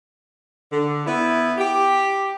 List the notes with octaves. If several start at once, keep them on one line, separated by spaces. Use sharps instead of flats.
D3
B3 E4
G4